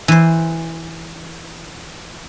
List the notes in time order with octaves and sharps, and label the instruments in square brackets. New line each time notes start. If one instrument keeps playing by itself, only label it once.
[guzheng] E3 C5